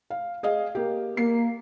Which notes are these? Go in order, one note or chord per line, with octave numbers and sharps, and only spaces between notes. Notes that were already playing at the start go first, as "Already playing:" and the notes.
F5
G#4 D#5 F5
A#3 G4
A#3 C7